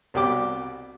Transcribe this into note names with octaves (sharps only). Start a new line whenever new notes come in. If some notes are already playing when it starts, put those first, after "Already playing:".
C2 B2 G3 G5 D6